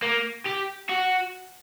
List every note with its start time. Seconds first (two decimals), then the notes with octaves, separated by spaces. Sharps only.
0.02 A#3
0.46 G4
0.89 F#4